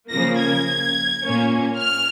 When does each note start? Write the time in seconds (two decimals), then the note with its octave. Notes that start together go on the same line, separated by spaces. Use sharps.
0.11 C#3 F3 A#3 A#6
0.39 G#6
1.23 A#2 A#3 C#4
1.79 F6